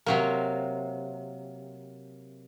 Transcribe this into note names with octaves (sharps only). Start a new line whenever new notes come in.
C3 F#3 A#3